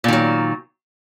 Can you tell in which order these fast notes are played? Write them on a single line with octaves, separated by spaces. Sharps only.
A#2 D#3 F#3